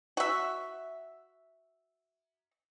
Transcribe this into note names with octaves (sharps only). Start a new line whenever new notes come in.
F#4 E5